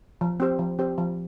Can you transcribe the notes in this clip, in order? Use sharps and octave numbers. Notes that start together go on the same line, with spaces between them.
F3
C4 G4 C5
F3
C4 G4 C5
F3